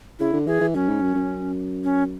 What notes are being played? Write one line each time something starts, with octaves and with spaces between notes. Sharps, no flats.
C#3 E4
D3
E3 G#4
E3
F#2 C#4
G#2
F#2
F#2
C#4